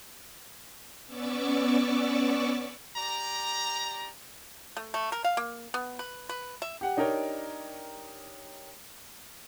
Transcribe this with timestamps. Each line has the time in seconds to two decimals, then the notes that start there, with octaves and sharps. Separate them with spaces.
1.06 B3 C#4 D5 C#6 D6 E6
2.97 G4 D5 A#5
4.77 A3
4.94 A3
5.12 A#4
5.24 F5
5.37 A#3
5.74 B3
5.99 B4
6.29 B4
6.62 E5
6.81 G4 F#5
6.97 D4 D#4 G4 A#4 C#5